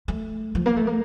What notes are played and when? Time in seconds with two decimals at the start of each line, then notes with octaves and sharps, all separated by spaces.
0.08 A3
0.55 F3
0.66 A#3
0.77 A3
0.87 A#3